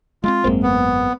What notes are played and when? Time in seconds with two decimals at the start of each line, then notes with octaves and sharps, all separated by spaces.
0.24 G#3 A3 C4 F4
0.44 G#1 F#2 G#3 A#3 C4
0.63 B3